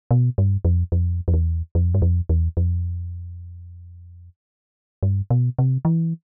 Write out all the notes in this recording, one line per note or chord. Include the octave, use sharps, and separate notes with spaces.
B2
G2
F2
F2
F2
E2
F2
G2
F2
E2
F2
G2
B2
C3
E3